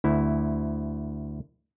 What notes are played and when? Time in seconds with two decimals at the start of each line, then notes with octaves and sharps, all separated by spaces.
0.04 D2 E4